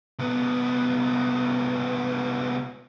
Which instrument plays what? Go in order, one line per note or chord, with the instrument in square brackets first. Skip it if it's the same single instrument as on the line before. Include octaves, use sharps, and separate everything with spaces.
[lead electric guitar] C2 B3